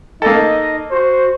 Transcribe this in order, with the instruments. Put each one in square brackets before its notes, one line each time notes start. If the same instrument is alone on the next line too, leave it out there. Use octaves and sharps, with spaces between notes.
[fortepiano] A#3 A4 [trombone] D#4 [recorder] D#5
[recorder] F#4 [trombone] C5